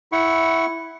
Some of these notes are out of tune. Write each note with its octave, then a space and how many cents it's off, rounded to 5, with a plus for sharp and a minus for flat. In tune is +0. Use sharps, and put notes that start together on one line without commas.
E4 +0 F#5 +15 C#6 -10